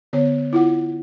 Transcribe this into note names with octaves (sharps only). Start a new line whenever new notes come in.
D3 B3 C#5
E4 F4 F#5